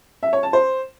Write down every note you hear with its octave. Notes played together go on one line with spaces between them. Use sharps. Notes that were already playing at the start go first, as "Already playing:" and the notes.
E5
C#5
A5
C5